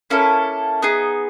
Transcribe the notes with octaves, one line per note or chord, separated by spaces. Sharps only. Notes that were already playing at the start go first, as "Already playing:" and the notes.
A#3 C#4 E4 A4
B3 D#4 G#4